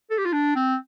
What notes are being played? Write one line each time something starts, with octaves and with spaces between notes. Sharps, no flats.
A4
G4
F4
D4
C4